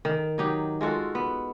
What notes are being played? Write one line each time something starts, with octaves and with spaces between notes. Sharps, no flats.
D#3
F#3 D#4 G4
G#3 F4 F#4 A4
B3